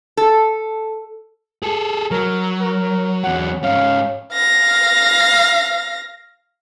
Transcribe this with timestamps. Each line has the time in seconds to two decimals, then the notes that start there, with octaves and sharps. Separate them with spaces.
0.17 A4
1.63 G#4 A4
2.11 F#3 A#4
2.61 A#4
3.24 E2 F#3 F#5
3.63 G#2 C#4 F5
4.33 F5 A#6